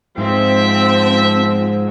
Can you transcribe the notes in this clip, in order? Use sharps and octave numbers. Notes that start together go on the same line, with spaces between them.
G#2 F3 C4 E5